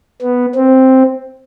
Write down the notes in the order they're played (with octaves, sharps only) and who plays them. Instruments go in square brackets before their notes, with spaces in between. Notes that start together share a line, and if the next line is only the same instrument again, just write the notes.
[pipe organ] B3
C4